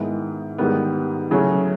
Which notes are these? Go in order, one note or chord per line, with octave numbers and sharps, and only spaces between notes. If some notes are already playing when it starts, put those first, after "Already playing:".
Already playing: G#2 D#3 G#3 B3 E4
G#2 D#3 G3 B3
C#3 F#3 A3 C#4